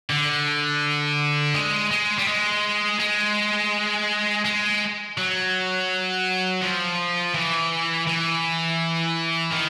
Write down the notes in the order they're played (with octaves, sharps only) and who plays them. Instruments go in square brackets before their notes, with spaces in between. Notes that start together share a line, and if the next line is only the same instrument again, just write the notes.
[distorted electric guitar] D3
G#3
G#3
G3
G#3
G#3
G#3
F#3
F3
E3
E3
D#3